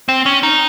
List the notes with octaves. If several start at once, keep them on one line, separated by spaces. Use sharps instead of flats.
C4
C#4
D#4